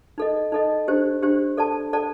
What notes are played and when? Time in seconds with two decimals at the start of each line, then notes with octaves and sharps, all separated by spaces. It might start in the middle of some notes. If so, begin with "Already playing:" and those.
0.18 D#4 A4 D#5
0.52 D#4 A4 D#5
0.88 D4 G4 C5
1.23 D4 G4 C5
1.57 A4 D5 A5
1.93 A4 D5 A5